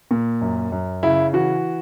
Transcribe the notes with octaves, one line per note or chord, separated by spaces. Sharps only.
A#2
F#2
F#2
C#3 E4
E3 F#4